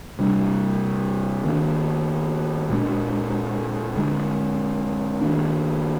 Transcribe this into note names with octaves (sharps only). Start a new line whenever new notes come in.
C3 G3 D4
D#3 A#3 D4
A#2 G#3 D4
D3 G#3 D4
D#3 A#3 D4